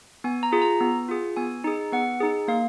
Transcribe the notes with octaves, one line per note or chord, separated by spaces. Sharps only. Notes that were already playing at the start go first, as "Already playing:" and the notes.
B3 G#5
A#5
F4 G#4
A#5
B3
F4 G#4
B3 G#5
D#4 G#4
B3 F#5
D#4 G#4
A#3 F5